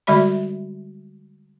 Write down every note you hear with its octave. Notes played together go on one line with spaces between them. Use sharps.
D3 G3 G#3 F#4 D5 B5